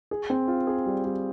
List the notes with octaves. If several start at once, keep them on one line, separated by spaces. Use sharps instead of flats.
G#4
C4
F4
G#4
G3
G3